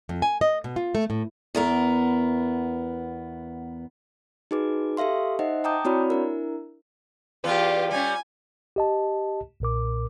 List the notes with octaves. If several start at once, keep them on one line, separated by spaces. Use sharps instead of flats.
F2
G#5
D#5
B2
F4
A3
A2
E2 B3 A#4
D#4 F#4 G#4 B4 D6
G4 A4 E5 F5 C6
D#4 C5 D#5 E5 F#5
G5 A5 A#5 D6 D#6 G6
C4 E4 F#4 C#5 D5 B5
D4 E4 A#4
E2 F4 G4 B4
G3 C#4 G#5
G4 D#5 A5
B1 A#2 A#4 D6